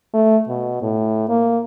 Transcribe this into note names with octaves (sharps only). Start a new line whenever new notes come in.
A3
B2
A2
A#3